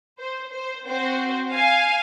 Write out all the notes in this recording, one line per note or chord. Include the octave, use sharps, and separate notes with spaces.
C5
C5
C4 F#4 C5
F5 G#5